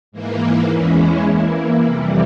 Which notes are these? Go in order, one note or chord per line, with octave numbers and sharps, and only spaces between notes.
G#2 E3 A#3
E2 E3 G#3 C#4 E4
E3 A#3 E4
F2 C3 E3 G3